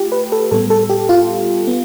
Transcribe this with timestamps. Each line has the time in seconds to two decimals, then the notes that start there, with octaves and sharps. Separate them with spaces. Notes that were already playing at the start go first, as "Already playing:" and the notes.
Already playing: A3 F4 G4
0.12 B4
0.32 A4
0.51 A2 G3 B3 A4
0.70 A4
0.90 G4
1.09 F4
1.67 B3